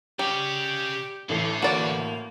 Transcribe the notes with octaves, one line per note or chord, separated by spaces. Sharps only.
C#3 G3 G4 C#5
A1 D3 A3 C7
A#3 F#4 B4 D5